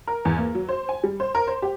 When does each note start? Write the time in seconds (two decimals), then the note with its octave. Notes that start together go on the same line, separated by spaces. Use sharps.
0.07 A#4
0.25 E2
0.38 A#3
0.55 F#3
0.69 C5
0.89 G#5
1.04 G3
1.20 C5
1.35 A#4
1.47 C5
1.62 G4